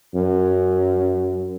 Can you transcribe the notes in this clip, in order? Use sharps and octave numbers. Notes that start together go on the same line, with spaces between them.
F#2